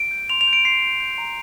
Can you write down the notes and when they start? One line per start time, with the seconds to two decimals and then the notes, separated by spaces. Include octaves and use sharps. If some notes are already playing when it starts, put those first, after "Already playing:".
Already playing: D7
0.11 G6
0.30 C6 F7
0.41 F7
0.47 G6
0.53 D7
0.65 C6 C7
0.82 G6
1.00 G6
1.18 A#5